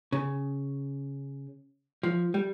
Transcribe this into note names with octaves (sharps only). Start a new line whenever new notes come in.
C#3
F3
G3